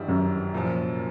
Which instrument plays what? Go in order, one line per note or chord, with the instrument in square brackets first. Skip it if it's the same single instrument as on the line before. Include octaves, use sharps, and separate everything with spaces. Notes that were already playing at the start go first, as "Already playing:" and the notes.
Already playing: [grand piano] G#1 G2 E3 G3
[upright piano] F#2
[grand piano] C2 A#2 F3